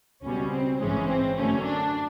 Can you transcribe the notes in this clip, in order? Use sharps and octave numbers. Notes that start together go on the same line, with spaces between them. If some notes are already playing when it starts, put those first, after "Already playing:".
C#2 B2 G3 C#4
C4
A1 G#2 E3 G#3 C#4
C4
F#2 D3 F#3 A3 C#4
D4